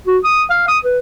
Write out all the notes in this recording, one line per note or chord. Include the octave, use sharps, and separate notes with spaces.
F#4
D#6
F5
D#6
B4